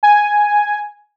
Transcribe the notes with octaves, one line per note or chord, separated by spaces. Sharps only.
G#5